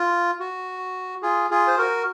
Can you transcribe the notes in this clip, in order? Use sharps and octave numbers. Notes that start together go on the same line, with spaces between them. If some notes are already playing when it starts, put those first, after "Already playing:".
Already playing: F4
F#4
F4 G#4
F4 G#4
C5
F#4 A#4